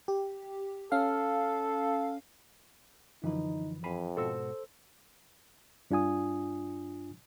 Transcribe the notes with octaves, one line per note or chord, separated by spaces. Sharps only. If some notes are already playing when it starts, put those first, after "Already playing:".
G4
C#4 A4 F5
F#2 D3 E3 F3 D#4 B4
F2 F5 G#5 B5
G#2 B2 F#4 A4 C5 E6
G2 D4 F4 G#5 D#6